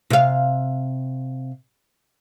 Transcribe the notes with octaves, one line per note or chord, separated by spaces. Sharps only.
C3 F5